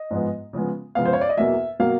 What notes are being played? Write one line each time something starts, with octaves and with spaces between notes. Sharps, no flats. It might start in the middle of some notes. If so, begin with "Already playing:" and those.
Already playing: D#5
G#2 F3 G#3 B3
C#3 F3 G#3 B3
C#3 F3 G#3 B3 F5
C5
C#5
D5
D#5
E2 B2 F#3 A#3 E5
B2 F#3 A#3 F5